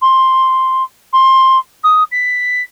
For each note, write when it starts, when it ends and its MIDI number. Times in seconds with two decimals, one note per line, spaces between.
0.01 0.83 84
1.13 1.58 84
1.83 2.03 87
2.11 2.62 95